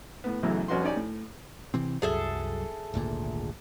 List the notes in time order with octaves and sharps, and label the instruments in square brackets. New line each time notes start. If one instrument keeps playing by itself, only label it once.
[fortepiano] A2 B3
B1 F#2 C#3 E3 F#3 A3
C2 F2 C#4 F#4 B4 C6
C#4 D#4 G4 D5 G#5
A2
[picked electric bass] C3 E3 C4
[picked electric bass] C2 F#2 F#3 [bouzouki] G#4 A4 E5
[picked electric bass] G#1 D2 A#2